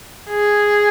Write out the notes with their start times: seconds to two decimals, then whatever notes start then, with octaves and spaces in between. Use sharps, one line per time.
0.30 G#4